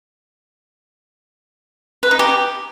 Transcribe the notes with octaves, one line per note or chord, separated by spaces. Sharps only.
B4
D#4
G4